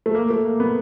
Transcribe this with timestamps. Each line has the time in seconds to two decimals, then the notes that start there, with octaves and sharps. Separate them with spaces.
0.06 A3
0.15 A#3
0.30 A3
0.45 A#3
0.60 B3